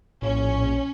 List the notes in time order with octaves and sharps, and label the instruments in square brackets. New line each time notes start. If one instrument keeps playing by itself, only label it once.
[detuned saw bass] A#1 [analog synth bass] A2 [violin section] C#4